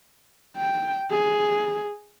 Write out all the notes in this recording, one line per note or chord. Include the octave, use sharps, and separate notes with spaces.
G5
G#4